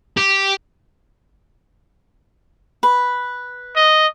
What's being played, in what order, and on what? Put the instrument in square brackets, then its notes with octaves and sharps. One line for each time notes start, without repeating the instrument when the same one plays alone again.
[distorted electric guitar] G4
[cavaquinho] B4
[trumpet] D#5